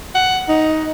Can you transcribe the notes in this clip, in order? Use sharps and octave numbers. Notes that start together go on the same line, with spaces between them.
F#5
D#4